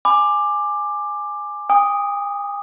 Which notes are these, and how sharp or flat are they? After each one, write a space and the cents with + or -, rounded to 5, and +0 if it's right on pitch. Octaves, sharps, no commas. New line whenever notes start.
G#5 +0 B5 +25 D6 +15
G#5 -45 D#6 +0